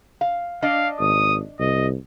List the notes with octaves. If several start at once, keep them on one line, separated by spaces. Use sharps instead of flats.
F5
D4 D5 D#5 F5
G#1 D#6
C2 D#5